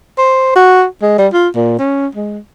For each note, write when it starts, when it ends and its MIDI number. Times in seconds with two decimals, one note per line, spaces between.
0.18 0.54 72
0.56 0.85 66
1.02 1.14 56
1.18 1.27 55
1.33 1.48 65
1.55 1.75 46
1.79 2.07 61
2.15 2.38 56